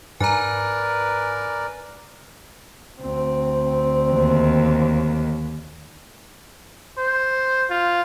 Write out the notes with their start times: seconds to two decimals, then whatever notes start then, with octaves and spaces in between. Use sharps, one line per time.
0.20 G#2 A#4 B4 D5 G#5 A#5
3.01 D2 C4
4.13 D#2
6.98 C5
7.70 F4